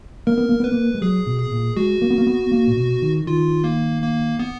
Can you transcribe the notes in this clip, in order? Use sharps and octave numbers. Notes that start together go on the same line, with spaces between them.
A#3 A#4
B3
A#3
B3 B4
A#3
G#3
F#3 G#4
B2
G#4
A#2
G#3 F#4
A#3
B3
A#3
B3
A#3
A#2
B2
D#3
D#3 F4
A#3
A#3
B3